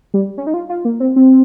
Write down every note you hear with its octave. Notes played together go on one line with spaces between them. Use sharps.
G3
C#4
D#4
F4
F4
A#3
C4
C4